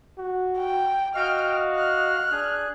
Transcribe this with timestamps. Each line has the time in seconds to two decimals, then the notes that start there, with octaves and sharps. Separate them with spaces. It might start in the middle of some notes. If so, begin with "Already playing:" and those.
0.18 F#4
0.58 G5
1.16 F#4 D#5 F5 G5 F6
1.76 F6 F#6
2.32 D4 G#4